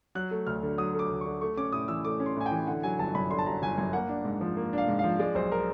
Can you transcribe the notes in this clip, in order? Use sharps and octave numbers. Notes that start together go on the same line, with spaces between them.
F#3 F#6
A3
D2 F6
D3
F#3 D#6
A3
D6
D2
D3 C#6
A3 C#6
C#4 D6
A2 D#6
E3 E6
A3 D6
C#4
C6
A2 G#5
G5
E3
D3 F#5
F#3 G#5
G1 A5
F#2 B5
D3 C6
A5
F#3 A#5
G1 G#5
F#2 G#5
A#3 F#5
D4
G#2
F3
A#3
D4 F5
G#2
F3 F5
G#3 D5
B1 C5
A#4